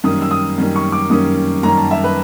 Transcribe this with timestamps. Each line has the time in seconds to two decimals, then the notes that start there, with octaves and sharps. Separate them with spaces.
0.04 F#2 D#3 G3 A#3 C#4 D#6
0.22 E6
0.31 D#6
0.58 F#2 D#3 G3 A#3 C#4
0.76 C#6
0.92 D6
1.10 F#2 D#3 G3 A#3 C#4 D#6
1.63 F#2 D#3 G3 A#3 C#4 A#5
1.77 A5
1.91 E5
2.04 B4